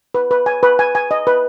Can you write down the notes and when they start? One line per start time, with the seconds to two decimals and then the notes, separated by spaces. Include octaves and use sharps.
0.14 B4
0.31 B4
0.46 G#5
0.63 B4
0.79 G#5
0.95 G#5
1.11 D#5
1.27 B4